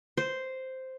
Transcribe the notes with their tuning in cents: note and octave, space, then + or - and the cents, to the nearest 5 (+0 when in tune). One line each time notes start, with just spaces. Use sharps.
C5 -5